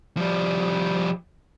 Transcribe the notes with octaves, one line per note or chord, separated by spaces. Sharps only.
F3 G3